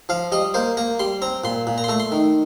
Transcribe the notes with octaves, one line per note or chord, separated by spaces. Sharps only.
F3 F5
G3 D#5
A#3 C5
A#3 A#5
G3 C6
C4 A#5
A#2 C6
A#2
A#5
C6
A3 A#5
C6
D#3